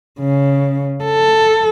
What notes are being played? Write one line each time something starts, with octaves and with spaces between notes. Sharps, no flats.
C#3
A4